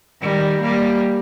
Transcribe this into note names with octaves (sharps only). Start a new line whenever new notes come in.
D#3 G3
G3 A#3